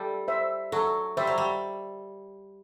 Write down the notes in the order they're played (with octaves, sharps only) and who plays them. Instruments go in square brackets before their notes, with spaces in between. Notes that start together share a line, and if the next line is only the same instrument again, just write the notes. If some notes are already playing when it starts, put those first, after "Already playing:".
Already playing: [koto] G3 [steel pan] A4
[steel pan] C5 E5
[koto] F#3 [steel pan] A4
[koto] G3 [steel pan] C5 E5
[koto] F#3
G3